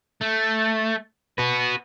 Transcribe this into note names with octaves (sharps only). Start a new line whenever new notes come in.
A3
F#4 B4